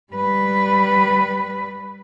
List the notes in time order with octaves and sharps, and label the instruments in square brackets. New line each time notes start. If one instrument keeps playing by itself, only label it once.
[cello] G3 B4